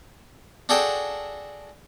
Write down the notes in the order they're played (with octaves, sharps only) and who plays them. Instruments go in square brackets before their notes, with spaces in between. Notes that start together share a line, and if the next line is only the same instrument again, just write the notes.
[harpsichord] D4 F#4 G#4 A4 D5 G5